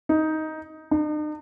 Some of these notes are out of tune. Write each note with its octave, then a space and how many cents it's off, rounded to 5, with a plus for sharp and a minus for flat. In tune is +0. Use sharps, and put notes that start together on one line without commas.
D#4 +10
D#4 -45